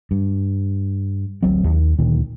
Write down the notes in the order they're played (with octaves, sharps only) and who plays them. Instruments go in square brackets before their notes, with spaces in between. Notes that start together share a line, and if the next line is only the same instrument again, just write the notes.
[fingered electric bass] G2
D1 A1 F#3 C4
D#2
D2 A#2 D#3